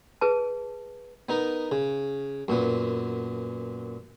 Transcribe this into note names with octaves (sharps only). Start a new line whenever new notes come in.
G#4 B4 A5
B3 D#4 A#4
C#3
F#2 A#2 B3